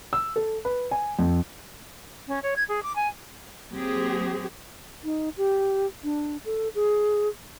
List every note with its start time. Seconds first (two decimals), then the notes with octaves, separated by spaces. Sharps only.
0.13 E6
0.36 A4
0.65 B4
0.91 G#5
1.19 F2
2.28 C#4
2.43 C#5
2.56 G#6
2.68 G#4
2.83 D6
2.96 G#5
3.72 F#3 A#3 C4 G4 G#4
5.04 D#4
5.37 G4
6.04 D4
6.45 A4
6.75 G#4